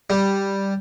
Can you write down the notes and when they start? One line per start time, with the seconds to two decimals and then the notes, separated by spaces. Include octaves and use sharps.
0.10 G3